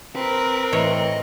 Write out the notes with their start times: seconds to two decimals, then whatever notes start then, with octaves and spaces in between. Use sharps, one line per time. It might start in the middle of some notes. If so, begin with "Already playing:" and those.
0.16 C4 A#4 B4
0.73 A2 E3 C#5 D#5